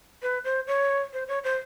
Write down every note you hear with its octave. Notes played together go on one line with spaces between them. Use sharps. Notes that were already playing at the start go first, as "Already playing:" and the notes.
B4
C5
C#5
C5
C#5
C5